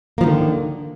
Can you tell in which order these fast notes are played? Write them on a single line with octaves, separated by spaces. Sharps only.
A#3 F3 D#3 D3